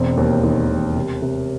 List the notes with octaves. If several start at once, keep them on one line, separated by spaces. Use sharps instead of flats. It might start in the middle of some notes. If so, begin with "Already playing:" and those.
Already playing: E1 C4
D#2
D#3
E1
C3
C3